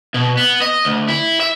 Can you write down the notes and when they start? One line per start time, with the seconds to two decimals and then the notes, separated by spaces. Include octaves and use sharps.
0.14 B2
0.37 B3
0.62 D#5
0.85 D2
1.08 E4
1.41 E5